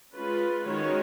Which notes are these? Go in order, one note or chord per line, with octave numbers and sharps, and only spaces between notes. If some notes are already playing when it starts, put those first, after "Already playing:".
G#3 C#4 F4 B4
D#3 G#3 C#4 F#4 C#5